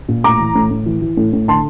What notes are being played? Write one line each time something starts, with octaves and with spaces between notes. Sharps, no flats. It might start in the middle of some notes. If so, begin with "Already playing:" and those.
A#2
A2 A#5 D6
E3
A2
A2
E3
E3
A2
A2
D3 A5 C6